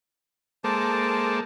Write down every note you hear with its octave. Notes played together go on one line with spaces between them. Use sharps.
G#3 A#3 A4 C5 A5 D6